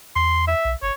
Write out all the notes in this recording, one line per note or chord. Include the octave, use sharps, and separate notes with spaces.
E2 C6
E5
B1
G1 C#5